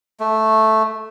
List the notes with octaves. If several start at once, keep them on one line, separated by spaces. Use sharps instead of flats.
A3